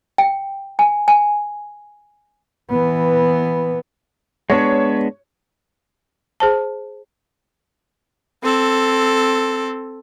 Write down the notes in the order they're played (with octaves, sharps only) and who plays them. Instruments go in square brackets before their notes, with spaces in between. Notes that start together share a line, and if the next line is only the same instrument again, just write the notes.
[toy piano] G5
G#5
G#5
[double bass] E3 B3
[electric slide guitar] G#3 B3 D4 [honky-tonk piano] C#5
[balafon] G#4 C5 A5
[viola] C4 A4